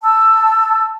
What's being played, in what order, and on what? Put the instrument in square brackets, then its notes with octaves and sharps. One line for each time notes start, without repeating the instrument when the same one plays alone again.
[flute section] A5 E6